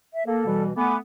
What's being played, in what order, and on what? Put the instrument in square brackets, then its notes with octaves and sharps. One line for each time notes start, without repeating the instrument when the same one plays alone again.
[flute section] E5
[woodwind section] A#3 [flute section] A4
[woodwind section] B2 E3 G3
[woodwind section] A3 B3 [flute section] G#5 B5 D6